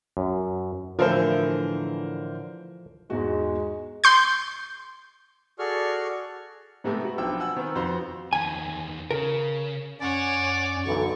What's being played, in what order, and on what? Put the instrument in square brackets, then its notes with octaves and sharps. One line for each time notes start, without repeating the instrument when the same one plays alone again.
[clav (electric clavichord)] F#2
[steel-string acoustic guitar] A2 D3 E3 [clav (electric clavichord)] F3 A4 [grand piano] A#4 C5
[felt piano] E2 G#2 F#4 [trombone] G#3
[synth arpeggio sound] C6 G6
[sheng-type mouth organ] F#4 G#4 A4 D5 C#6 F6
[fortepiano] G#2 C3 A3 B3
F#4
B1 F3 C4 D4 G5 E6
F#5 G#5 E6
D#3 B3 C4
F2 F#4 C5 C6
[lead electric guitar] E2 D#3 [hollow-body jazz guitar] G#5
[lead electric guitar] C#3 [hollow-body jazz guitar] A#4
[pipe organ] F#2 C#4 [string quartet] C#5 F#5 G#5 [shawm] D5
[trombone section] B1 D3 E3 [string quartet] C#6